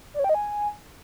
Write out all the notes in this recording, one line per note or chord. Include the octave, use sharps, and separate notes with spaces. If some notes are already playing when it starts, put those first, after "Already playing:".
D5
C#5
G5
D#5
G#5